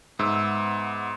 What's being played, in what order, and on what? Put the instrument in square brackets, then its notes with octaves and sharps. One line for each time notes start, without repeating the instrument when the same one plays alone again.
[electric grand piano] G#2 [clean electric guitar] B3 E5